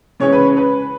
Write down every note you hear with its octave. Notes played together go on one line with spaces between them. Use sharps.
C#3 E3 G#3 C#4 C#5
B4
B4